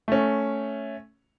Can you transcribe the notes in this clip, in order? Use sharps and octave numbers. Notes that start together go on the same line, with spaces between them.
A3 C#4